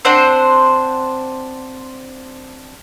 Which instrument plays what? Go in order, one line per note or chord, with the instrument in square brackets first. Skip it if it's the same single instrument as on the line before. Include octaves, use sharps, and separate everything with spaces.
[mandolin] C4 D4 C5 F#5